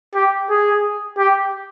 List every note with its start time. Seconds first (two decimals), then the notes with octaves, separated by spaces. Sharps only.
0.15 G4
0.50 G#4
1.18 G4